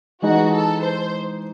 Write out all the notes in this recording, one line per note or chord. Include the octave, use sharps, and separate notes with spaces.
E3 G#3 D#4 F#4 G#4
A4
C5